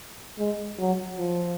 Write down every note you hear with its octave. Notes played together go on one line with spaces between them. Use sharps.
G#3
F#3
F3